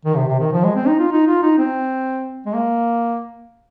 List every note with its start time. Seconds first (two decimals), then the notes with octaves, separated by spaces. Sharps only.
0.05 D#3
0.16 C3
0.28 C3
0.40 D#3
0.53 F3
0.64 G#3
0.76 C4
0.87 D#4
0.99 F4
1.12 D#4
1.27 F4
1.43 D#4
1.58 C4
2.46 G#3
2.54 A#3